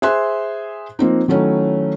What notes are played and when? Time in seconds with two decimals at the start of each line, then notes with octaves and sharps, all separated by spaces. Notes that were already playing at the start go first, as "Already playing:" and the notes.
0.02 G#4 C5 E5 C6 F#6
0.99 F3 A#3 C4 D#4
1.28 D#3 F#3 A3 C#4 D#4 E4